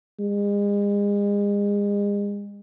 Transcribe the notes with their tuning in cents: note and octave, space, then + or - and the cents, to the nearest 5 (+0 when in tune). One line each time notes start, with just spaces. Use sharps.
G#3 -35